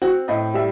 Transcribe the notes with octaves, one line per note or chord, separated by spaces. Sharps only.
C4 F#4
A2 D#5
G3 E5